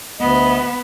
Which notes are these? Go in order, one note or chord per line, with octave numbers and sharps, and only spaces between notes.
D2 B3 D#5